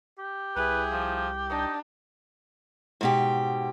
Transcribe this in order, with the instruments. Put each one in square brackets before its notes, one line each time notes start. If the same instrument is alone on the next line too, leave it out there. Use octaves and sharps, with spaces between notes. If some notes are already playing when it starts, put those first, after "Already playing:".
[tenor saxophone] G4
[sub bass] C2 [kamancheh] E4 G#4 [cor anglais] B4
[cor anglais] F3
[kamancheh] D4 [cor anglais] D#4
[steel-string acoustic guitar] G#2 B2 G4